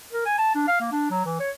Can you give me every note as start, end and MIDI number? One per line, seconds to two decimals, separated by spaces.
0.13 0.25 70
0.25 0.38 80
0.38 0.54 81
0.55 0.64 62
0.68 0.76 77
0.81 0.88 58
0.92 1.09 62
1.11 1.25 54
1.25 1.37 52
1.40 1.50 73